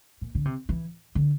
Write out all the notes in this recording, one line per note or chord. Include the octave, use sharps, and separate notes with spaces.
A#2
D3
C3
E3
D3